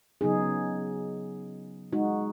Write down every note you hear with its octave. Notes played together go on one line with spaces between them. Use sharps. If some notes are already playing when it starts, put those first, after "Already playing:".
C#3 F#3 B3 D#4 G#4
G#3 D#4 F#4